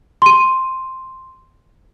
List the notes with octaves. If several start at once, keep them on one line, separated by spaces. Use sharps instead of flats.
C6 D#7